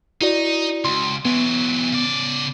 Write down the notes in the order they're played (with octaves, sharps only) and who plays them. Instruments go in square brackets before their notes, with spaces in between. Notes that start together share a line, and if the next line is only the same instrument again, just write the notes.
[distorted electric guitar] D#4 [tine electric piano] E4 F#4 D5
[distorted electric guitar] C#2 [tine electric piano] C6
[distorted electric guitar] E3 F#3 [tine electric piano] B3
[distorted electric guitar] C#3 D5